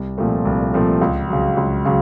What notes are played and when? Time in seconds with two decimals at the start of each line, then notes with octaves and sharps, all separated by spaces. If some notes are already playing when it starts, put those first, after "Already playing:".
Already playing: C2
0.18 A#2 F3 A3 C4
0.45 C2
0.74 A#2 F3 A3 C4
1.01 C#2
1.29 C#3 F#3
1.57 C#2
1.85 C#3 F#3